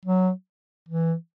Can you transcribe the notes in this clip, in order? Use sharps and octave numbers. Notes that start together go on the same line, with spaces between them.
F#3
E3